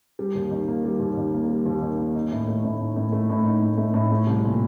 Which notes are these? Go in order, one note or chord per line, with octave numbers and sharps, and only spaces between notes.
G3
D#2
D#3
A#3
G3
D#2
D#3
A#3
G3
D#2
D#3
A#3
D#4
A2
A3
A2
D#4
A2
A3
A2
D#4
A2
A3
A2
A3
C2
A#2